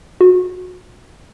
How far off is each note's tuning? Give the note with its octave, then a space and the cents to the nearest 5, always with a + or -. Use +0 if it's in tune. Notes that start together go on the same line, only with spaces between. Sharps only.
F#4 -30